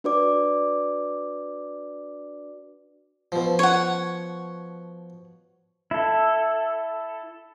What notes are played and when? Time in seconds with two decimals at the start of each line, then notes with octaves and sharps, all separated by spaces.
0.04 D4 F#4 B4 D5 D6
3.32 B2 F3
3.59 C#5 F#5
5.91 E4 A4